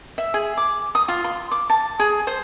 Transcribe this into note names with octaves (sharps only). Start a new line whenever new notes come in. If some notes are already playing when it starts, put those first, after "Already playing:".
E5
G#4
D6
D#6
F4
C6
D6
A5
G#4
C5